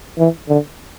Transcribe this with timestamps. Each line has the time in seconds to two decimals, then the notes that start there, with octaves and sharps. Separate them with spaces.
0.18 E3
0.49 D3